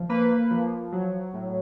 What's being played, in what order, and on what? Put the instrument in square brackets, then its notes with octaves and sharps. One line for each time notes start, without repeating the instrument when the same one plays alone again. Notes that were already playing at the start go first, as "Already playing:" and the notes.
Already playing: [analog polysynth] F3
A#3 B4
F3
F#3
A2